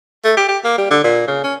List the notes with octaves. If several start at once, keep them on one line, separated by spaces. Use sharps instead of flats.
A3
G4
G4
A#3
G3
D3
A#2
C#3
C#4